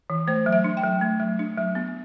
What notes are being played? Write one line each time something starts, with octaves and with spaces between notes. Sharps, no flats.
E3
A3 C5
F#3
E5
D4
G5
F#3
A3
F#3
D4
F#3
B3